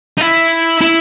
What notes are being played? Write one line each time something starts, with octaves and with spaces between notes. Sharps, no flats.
D#4
E4
E4